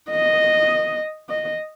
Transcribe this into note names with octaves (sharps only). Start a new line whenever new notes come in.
D#5
D#5